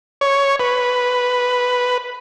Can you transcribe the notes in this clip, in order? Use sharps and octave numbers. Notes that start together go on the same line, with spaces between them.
C#5
B4